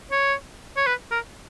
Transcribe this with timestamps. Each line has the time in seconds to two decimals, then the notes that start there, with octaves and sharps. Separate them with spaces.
0.11 C#5
0.77 C#5
0.86 B4
1.11 A#4